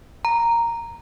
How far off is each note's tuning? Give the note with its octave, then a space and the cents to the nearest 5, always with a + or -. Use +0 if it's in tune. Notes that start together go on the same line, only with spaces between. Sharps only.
A#5 -5